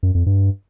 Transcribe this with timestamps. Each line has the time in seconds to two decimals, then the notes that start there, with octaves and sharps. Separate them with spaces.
0.03 F#2
0.15 F2
0.26 G2